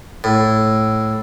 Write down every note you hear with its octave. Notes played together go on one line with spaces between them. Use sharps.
A2